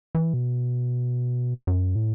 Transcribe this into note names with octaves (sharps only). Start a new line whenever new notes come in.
E3
B2
F#2
A2